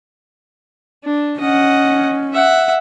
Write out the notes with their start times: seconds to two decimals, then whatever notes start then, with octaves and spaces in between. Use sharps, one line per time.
1.04 D4
1.40 C#4 D#5 F#5
2.33 E5 F#5